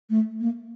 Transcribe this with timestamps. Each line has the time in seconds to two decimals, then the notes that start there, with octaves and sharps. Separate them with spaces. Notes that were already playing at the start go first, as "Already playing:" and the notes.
0.10 A3
0.40 A#3